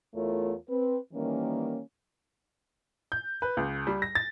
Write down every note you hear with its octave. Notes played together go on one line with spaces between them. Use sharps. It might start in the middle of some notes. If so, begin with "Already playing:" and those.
E2 A3 E4 F4 A#4 C#5
C4 B4
D#3 E3 G3 A#3 C#4
G6
B4
C#2
G3
A#6
A6